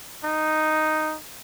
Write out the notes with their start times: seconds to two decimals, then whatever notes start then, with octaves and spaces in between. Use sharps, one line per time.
0.24 D#4